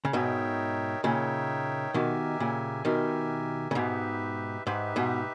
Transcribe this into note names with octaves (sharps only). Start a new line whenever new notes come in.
C#3
G#2 B2 D#4 A#4 C#5 E5 G5
A#2 C#3 D#4 A#4 C#5 E5 G5
B2 D#3 G4 A#4 E5 G#5
A#2 C#3
B2 D#3 G4 A#4 E5 G#5
C#3
G#2 B2 D#4 G4 B4 E5
G#2 D#4 G4 B4 E5
G#2 B2